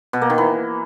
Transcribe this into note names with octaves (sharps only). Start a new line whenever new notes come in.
B2
A#3
D#3
E3